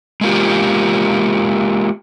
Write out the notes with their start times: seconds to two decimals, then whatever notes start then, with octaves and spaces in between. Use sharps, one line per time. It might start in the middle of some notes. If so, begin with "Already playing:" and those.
0.21 G#3 A#3 F4 G4